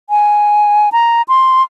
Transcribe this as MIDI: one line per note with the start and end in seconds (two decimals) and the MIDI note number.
0.10 0.90 80
0.92 1.22 82
1.28 1.63 84